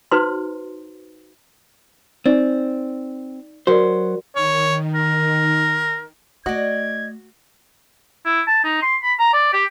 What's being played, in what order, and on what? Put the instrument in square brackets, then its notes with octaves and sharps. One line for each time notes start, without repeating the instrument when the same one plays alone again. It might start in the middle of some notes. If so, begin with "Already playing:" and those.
[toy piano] D#4 F#4 B4 C5 C6
[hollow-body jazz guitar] C4 [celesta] D#4 D5 A6
[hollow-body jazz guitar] F#3 C5 [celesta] F#4 A#4 D5
[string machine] D#3 [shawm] C#5
[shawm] A#4
[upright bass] A3 [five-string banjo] F#4 [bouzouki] D5 D#5 [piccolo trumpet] G#6
[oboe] E4
A5
D#4
C6
B5
A#5
D5
G4